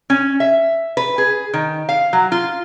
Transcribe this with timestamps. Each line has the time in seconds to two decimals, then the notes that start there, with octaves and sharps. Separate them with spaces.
0.10 C#4
0.40 E5
0.97 B4
1.18 G#4
1.53 D#3
1.89 F5
2.13 F#3
2.32 F4